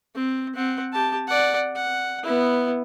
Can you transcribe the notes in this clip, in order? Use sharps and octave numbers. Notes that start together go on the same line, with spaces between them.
C4
C4 F#5
G4 A5
D5 F#5
F#5
B3 E4